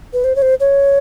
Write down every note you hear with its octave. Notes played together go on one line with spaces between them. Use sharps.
B4
C5
C#5
C5
C#5